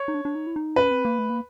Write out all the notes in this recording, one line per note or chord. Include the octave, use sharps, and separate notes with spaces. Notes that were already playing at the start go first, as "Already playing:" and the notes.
Already playing: C#5
D#4
D4
D4
D#4
E4
D#4
C#4 B4
C4
A#3
A3
A#3